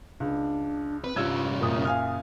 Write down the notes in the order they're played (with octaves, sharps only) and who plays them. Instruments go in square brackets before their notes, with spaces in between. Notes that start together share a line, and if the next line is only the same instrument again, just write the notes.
[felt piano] C#2 [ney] D4
[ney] C4 [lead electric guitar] B4
[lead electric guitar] C2 C#4 [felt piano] G2 E6 G#6 [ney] F4
[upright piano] F#1 A#2 D#6 [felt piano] A#3 [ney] E5
[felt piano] F5 G#5 F6